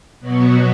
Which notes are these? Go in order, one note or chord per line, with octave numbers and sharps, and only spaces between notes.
B2 F#3 B3 F#4